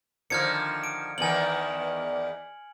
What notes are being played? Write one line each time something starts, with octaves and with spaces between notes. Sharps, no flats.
D3 D#3 F3 F6 G#6 C#7
D7
E2 D#3 E3 G#5 F#7